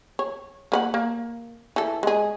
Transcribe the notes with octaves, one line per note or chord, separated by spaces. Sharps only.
C#5
A#3 B4 F#5
A#3
E3 A4
G#3 G#4